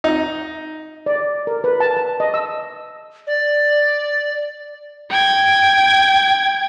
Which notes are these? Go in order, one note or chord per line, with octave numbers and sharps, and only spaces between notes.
D#4
D5
A#4
B4
A5
A5
D#5
E6
D5
G5 G#6